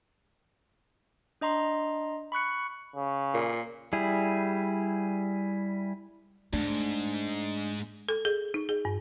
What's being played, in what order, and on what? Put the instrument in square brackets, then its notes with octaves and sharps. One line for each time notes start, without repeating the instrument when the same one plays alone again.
[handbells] D4 D#5 A#5 C6
B5 C#6 F#6 C#7
[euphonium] C#3
[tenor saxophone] A#2
[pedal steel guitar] G3 E4 G#4
[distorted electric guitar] E2 G#2 [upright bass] A3 [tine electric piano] D4
[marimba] A4
G#4
D#4
G#4
G2